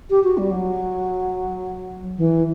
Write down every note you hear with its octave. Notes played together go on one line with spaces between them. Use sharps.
G4
F#4
G3
F#3
E3